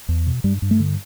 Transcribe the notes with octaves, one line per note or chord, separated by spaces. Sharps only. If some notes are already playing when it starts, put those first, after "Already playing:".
E2
B2
G2 G3
G2
A3
D3